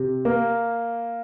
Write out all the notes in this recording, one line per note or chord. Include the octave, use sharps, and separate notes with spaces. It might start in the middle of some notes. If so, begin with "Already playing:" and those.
Already playing: C3
A#3